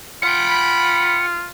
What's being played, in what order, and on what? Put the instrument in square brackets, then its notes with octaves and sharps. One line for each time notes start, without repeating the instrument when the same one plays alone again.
[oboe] F4 [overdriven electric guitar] F#5 G5 [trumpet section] B5